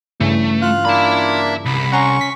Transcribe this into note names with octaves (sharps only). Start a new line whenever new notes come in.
G2 C#3 E3 A3
F4 F5 F#6
A#3 D4 E5 B5
C2 B5
C#4 F#5 A#5 C6 C#6
B6